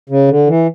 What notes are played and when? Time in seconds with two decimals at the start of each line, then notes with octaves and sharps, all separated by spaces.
0.09 C#3
0.28 D3
0.47 E3